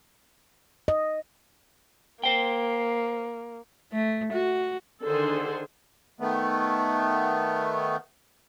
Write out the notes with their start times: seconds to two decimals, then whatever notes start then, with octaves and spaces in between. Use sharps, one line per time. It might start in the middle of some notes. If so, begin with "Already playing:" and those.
0.88 D#5
2.24 A#3 C5 G5
3.93 A3
4.33 F#4
5.04 D3 D#3 G#4 A4 C5
6.20 D#3 A3 B3